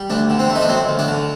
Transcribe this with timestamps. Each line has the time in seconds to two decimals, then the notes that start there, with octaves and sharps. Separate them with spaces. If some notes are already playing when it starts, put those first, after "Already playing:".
Already playing: G3
0.10 D2 D4
0.30 D3
0.39 C4
0.49 A3
0.55 D#4
0.61 D4
0.68 F#3 C4
0.89 D2
0.99 D4
1.08 D3